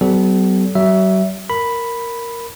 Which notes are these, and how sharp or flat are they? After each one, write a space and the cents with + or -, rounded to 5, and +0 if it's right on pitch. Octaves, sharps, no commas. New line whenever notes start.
F#3 +45 B3 +40 A4 -35
F#3 +40 E5 +0
A#4 -5 B5 +0